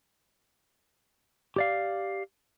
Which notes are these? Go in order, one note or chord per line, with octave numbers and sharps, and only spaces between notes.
G4 D5 F5